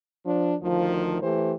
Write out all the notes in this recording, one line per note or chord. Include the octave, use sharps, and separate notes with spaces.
F3 D4
D2 D#3 F3
E3 A3 G4 C5